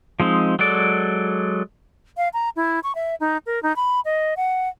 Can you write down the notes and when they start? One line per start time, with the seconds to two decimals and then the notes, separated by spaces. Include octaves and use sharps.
0.20 F3 G#3 C4 D#4
0.59 F#3 G#3 A4 D5
2.17 F5
2.34 A#5
2.56 E4
2.83 C#6
2.95 E5
3.20 D#4
3.46 A#4
3.63 D#4
3.76 B5
4.05 D#5
4.37 F#5